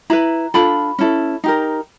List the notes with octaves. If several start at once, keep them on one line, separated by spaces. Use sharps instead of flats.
E4 G#4 B4 A#5
D4 F4 A4 B5
C#4 E4 A4
D#4 G4 A#4